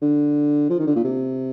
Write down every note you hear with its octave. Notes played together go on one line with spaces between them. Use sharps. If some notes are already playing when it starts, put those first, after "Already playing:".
D3
F3
D#3
D3
A#2
C3